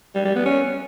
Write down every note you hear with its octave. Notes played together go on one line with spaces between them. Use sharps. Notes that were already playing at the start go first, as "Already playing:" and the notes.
G3
G3
B3
C#4